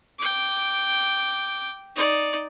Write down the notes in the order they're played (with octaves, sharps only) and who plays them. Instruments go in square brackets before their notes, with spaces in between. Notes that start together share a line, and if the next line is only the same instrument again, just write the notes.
[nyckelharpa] G5 D6
D#4 D5